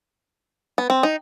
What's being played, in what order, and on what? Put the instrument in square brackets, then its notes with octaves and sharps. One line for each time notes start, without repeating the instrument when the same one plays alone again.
[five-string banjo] B3
C4
D#4